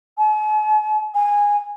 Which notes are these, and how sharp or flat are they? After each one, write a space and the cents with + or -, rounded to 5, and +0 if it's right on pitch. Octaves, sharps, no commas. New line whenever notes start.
G#5 +45
G#5 -15